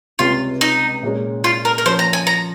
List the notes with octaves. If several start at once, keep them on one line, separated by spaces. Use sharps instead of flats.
C#2 C3 G3 C#4 F4
D#4
A#2 G#3 C#4
F4
A#4
A#4
F3 A#3 C#4 C5
A#5
G#5
A#5